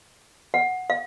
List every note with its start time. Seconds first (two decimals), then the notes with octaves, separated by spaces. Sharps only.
0.54 F#5
0.90 F5